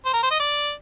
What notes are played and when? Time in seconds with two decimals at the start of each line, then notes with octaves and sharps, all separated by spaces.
0.06 C5
0.13 A#4
0.23 C5
0.31 D#5
0.40 D5